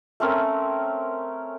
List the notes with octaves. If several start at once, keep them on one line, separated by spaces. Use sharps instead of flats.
A3 C4 C#4 A#4